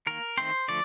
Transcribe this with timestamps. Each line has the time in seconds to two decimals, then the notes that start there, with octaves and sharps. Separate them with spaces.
0.07 D#3 A#3 A#4
0.37 D#3 A3 C4 C5
0.68 D3 F3 A3 D5